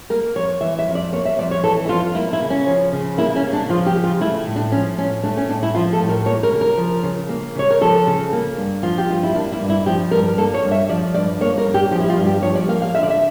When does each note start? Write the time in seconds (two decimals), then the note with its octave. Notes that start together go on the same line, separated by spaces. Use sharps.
0.10 A#3 A#4
0.35 F2 C#5
0.61 E3 E5
0.79 E5
0.87 F2
0.95 D5
1.12 A#3 C#5
1.25 E5
1.39 F2 D5
1.51 C#5
1.63 E3 A4
1.85 E4
1.89 F2 F4
2.15 A#3 E4
2.33 E4
2.42 C#3
2.50 C#4
2.66 F3
2.93 C#3
3.18 A#3 E4
3.36 C#4
3.45 C#3
3.53 D4
3.69 F3 F4
3.86 G4
3.96 C#3
4.04 F4
4.21 A3 E4
4.46 A2
4.56 D4
4.72 F3 C#4
4.98 A2 C#4
5.23 A3 D4
5.37 C#4
5.49 A2 D4
5.63 E4
5.75 F3 F4
5.93 A4
6.00 A2
6.09 A#4
6.26 A#3 C#5
6.43 A#4
6.52 C#3
6.61 A#4
6.77 F3
7.03 C#3
7.29 A#3
7.55 C#3 C#5
7.70 A#4
7.81 F3 A4
8.07 C#3
8.32 A#3
8.57 G2
8.83 F3 F4
8.98 G4
9.09 G2 F4
9.23 E4
9.34 A#3 D4
9.52 E4
9.60 G2
9.70 E4
9.86 F3 G4
10.11 G2 A#4
10.38 A#3 A4
10.54 C#5
10.64 G2
10.71 E5
10.89 F3 D5
11.14 G2 D5
11.41 A#3 C#5
11.58 A#4
11.67 G2
11.74 G4
11.91 F3 G4
12.00 E4
12.10 F4
12.18 G2
12.26 G4
12.43 F3 C#5
12.55 D5
12.69 A#3 F5
12.82 F5
12.94 D3 E5
13.03 D5
13.10 E5